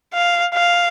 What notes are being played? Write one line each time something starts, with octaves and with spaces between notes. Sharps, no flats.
F5
F5